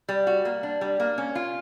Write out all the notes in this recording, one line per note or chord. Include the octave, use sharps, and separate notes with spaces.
G3
F#4
A#3
D4
G3
A#3
C#4
F4